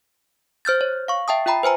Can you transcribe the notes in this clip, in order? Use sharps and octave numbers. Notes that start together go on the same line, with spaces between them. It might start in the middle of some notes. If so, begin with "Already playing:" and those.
C5 F6 G6 A6
C#5
F5 C#6
E5 G5 A5 D#6
F4 E5 G5 A#5 B5
B4 C5 G#5 A#5